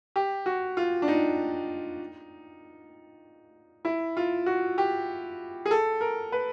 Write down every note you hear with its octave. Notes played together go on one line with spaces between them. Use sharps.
G4
F#4
F4
D4
D#4
E4
F4
F#4
G4
G#4
A4
A#4
B4